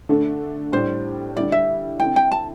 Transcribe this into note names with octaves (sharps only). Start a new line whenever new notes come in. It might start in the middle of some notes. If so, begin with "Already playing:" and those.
D3 A3 D4 A4
A2 G3 D4 C5
D3 G3 E4 D5
E5
D3 C4 E4 G5
G5
A5